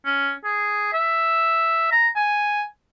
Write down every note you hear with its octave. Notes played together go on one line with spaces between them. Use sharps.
C#4
G#4
E5
A#5
G#5